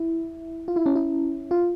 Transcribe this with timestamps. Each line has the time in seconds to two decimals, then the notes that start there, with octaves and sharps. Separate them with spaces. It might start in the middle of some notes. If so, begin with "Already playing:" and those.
Already playing: E4
0.68 F4
0.76 E4
0.86 C#4
0.96 E4
1.51 F4